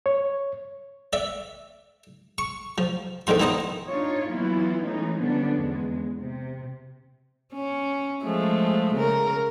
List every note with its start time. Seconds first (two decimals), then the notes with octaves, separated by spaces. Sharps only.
0.06 C#5
1.13 D5 E5
2.38 C#6
2.78 F3
3.27 E2 D3 D#3 F3 C6
3.40 E3 B3 D#4 C5 D#5
3.88 D4 D#4 F4 C#5
4.30 E3 F#3 B3 E4 F4
4.84 E3 G#3 A3 C#4 D#4
5.19 D3 F3 G3 B3 C#4 D4
5.56 E2 G#3
6.18 C3
7.54 C#4
8.24 F3 G#3 A3
8.94 C#3 A#4